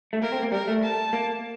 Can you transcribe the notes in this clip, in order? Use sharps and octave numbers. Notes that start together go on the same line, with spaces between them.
A3
A#3 A#4
C4
A#3
G3 A#4
A3
A5
A#3